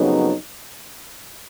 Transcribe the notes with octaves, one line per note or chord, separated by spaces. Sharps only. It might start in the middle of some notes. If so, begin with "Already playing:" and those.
Already playing: F2 C#3 F#3 B3 D#4